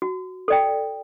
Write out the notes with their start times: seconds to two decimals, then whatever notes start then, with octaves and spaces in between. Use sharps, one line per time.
0.02 F#4
0.48 A4 D5 G5